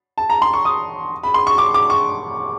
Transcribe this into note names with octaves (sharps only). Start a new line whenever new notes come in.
A5
A#5
C6
C#6
D#6
B5
C6
C#6
D6
D6
C#6